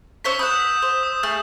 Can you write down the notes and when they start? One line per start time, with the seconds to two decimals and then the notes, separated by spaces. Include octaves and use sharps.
0.24 C#4 C5 C#5 E6 B6
0.39 B4 F#5 D#6 G6 E7
0.60 B6
0.82 C5
1.03 D#6
1.23 A3 G#4 F6